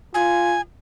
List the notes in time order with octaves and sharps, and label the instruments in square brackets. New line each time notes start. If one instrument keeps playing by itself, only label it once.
[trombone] F4 [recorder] G#5